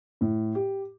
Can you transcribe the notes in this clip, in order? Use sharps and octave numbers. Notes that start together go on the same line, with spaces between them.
A2
G4